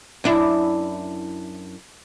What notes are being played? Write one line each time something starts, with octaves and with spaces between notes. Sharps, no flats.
F#2 D4 E4